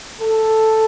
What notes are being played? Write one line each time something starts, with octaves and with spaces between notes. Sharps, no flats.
A4